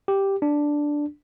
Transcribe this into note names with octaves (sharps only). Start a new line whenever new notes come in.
G4
D4